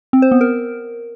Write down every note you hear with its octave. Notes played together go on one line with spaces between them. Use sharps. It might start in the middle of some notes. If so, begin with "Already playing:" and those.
C4
C5
B3
A#4